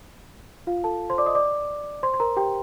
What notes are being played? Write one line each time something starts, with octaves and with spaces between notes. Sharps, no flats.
F4 F5
A4 A5
C5 C6
D5 D6
D#5 D#6
D5 D6
C5 C6
C6
A#4 A#5
G4 G5